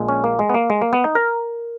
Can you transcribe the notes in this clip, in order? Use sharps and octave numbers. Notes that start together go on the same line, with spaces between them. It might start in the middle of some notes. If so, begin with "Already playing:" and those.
Already playing: A#1 A#2 G#3
C#4
A#3
G#3
B3
A#3
G#3
A#3
B3
D#4
A#4